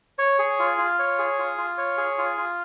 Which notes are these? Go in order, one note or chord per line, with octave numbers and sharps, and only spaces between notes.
C#5
G#4
F4
F4
C#5
G#4
F4
F4
C#5
G#4
F4
F4